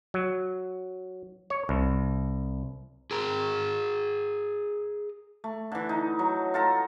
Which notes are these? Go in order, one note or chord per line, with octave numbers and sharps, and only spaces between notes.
F#3
C#5
C2
G#4 A#4
A3
D3 E3
D#4
F#3
F4 A4 A#5